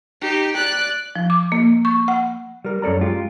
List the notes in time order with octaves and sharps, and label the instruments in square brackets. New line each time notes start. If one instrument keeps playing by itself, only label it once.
[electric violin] D#4 G4
D5 F#6
[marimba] F3
D6
A#3
C#6
F#5
[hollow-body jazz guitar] G3 A#4
F#2 C#4 A4 D5 A#5
G#3 F4 G4